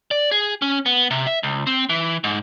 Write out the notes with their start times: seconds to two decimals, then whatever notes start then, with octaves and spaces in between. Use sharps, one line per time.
0.11 D5
0.31 G#4
0.62 C#4
0.86 B3
1.11 C3
1.27 E5
1.43 C#2
1.67 C4
1.89 E3
2.24 G#2